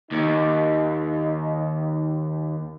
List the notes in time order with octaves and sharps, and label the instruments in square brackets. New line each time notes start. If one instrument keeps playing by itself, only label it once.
[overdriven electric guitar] D#2 [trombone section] D#4